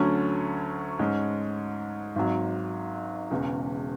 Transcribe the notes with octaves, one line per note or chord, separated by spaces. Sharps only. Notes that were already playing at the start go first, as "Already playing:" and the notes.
Already playing: D2 D3 F#3 A3 C#4
G#2 G#3 C#4
G#1 G#2 F#3
E1 E2 C#3